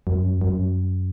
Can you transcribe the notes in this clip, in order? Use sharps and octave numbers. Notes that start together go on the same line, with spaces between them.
F#2
F#2